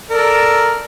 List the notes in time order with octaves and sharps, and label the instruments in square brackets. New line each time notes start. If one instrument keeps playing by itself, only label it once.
[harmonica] A4 A#4 D5